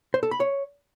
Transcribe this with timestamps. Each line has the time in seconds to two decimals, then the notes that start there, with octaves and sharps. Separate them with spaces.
0.14 C5
0.23 A4
0.31 B5
0.40 C#5